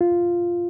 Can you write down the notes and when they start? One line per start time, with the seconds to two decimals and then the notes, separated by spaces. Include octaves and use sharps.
0.01 F4